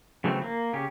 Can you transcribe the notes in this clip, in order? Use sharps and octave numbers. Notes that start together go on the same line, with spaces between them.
C#3 E3 F#3 A3 C4
A#3
C#3 C#4 G4